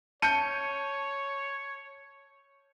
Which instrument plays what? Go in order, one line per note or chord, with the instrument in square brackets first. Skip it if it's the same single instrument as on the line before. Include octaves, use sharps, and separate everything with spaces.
[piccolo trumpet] C#5 [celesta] A5 [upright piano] G6 C#7 D#7